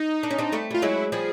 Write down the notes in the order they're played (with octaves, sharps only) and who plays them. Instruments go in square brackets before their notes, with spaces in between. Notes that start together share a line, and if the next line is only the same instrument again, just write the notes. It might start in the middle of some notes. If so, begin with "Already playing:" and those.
Already playing: [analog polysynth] D#4
[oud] D4
C#4
C4 D4
G3 A3
[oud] G3 [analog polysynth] F4
[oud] F#3 G#3 [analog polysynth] E4
[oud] F3 G3 [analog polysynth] G#4